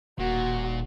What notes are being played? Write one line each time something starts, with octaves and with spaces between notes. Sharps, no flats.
D#1 A#2 F#4